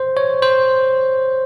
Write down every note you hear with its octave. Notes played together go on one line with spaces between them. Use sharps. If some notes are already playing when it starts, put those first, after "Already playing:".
Already playing: C5
C#5
C5